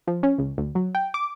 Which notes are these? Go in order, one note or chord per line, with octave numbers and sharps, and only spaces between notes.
F3
C#4
C#2
D2
F#3
G5
D6